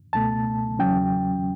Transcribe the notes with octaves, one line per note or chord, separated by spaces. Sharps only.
C#2 B2 A3 A5
E2 C#3 F#3 C#4 G5